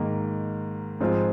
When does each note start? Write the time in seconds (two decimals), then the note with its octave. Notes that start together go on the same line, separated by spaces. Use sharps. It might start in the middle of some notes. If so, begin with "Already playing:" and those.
Already playing: G#2 D#3 A#3
1.01 G#2 F3 C4 F4 G#4